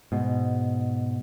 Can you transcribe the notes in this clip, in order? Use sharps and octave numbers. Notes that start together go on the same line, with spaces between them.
G#2 B2